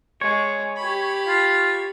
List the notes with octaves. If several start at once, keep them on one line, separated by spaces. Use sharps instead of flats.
G#3 C#5
G4 B5
F4